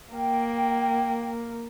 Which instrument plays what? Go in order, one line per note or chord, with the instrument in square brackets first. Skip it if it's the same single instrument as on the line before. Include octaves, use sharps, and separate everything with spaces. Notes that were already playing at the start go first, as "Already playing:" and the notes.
[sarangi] A#3 [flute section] G5